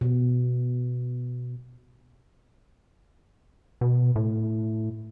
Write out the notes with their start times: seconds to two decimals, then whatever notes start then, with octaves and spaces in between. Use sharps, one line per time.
0.01 B2
3.81 B2
4.16 A2